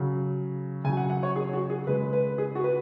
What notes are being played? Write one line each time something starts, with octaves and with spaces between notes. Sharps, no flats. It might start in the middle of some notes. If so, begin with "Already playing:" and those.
Already playing: C#3 F#3
C#3 F#3 G#5
F#5
F#5
C#5
G#4
F#4
G#4
C#3 G#3 B4
B4
G#4
F#4
B4